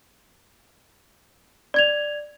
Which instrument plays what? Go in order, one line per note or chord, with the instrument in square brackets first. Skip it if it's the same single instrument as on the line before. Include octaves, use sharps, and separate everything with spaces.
[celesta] D5 G#6 F7